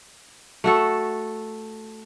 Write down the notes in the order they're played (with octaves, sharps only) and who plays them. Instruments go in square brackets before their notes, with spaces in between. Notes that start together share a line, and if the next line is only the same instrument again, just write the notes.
[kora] A3 F#4 A4